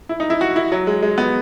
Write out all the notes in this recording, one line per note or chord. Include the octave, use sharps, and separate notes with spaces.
E4
D#4
E4
F#4
E4
F#3
G#3
G#3
B3